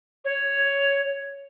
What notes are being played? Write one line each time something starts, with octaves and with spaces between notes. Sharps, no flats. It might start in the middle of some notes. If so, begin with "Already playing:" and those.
C#5